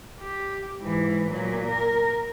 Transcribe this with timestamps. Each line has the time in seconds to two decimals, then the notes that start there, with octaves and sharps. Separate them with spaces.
0.20 G4
0.82 G#2 E3
1.29 A#2 F#3
1.68 A#4